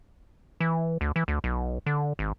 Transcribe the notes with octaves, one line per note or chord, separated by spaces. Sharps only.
E3
D2
E3
D2
B1
D3
G#1